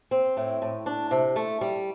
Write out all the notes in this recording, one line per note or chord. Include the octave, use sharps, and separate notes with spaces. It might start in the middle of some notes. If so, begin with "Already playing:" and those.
C4
A2
A2
D4
C3
A3
G3